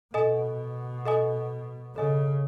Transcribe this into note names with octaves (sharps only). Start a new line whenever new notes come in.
B2 A4 D#5 G#5 D#6
A4 D#5 G#5 D#6
C#3 A4 D#5 G#5 D#6